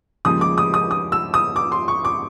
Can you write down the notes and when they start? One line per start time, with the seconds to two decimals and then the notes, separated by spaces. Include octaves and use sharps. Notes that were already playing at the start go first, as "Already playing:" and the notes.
0.25 D#2 C#3 F3 G#3 D#6
0.41 D6
0.58 D#6
0.74 D#6
0.91 D#6
1.12 E6
1.34 D#6
1.56 D6
1.72 C6
1.88 C#6
2.05 D6